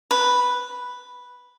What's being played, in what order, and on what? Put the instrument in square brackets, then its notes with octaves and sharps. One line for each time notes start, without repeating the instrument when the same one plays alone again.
[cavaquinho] B4